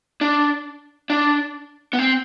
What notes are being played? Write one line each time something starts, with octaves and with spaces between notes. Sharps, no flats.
D4
D4
B3
C4